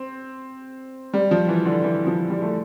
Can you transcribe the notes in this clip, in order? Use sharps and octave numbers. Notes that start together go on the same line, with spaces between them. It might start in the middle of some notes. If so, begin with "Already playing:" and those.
Already playing: C4
G3
F3
E3
D3
E3
F3
G3
A3